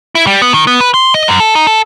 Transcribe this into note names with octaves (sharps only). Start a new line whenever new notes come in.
E4
G3
B3
D#3
B3
B4
C6
D#5
F#2
A4
D#4
A4